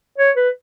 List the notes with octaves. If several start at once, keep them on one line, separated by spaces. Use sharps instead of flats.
C#5
B4